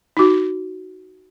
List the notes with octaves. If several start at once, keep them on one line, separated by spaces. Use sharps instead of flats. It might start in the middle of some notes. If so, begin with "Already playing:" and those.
D#4 F#4